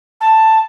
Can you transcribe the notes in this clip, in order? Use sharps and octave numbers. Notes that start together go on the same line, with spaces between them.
A5